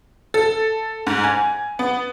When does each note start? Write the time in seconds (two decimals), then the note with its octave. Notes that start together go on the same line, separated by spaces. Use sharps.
0.34 A4
1.07 G#2
1.24 G#5
1.79 B3